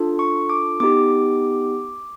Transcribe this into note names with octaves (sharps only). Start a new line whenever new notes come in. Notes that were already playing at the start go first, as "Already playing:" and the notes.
Already playing: D4 F4 A4
C#6
D6
B3 D#4 G4 D6